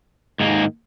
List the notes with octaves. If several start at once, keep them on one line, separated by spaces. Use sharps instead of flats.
G#2 D#3 A#3